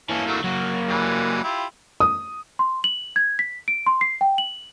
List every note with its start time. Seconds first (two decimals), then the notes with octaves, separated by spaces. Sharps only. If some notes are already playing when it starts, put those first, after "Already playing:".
0.09 E3 A#3 C#4 A4
0.27 F#3 A3
0.44 F#3 A#3 F#4
0.89 E3 G3 G#3
1.44 E4 F4 G4
2.00 D#6
2.59 C6
2.84 F#7
3.16 G#6
3.39 B6
3.68 D7
3.86 C6
4.01 C7
4.21 G5
4.38 F#7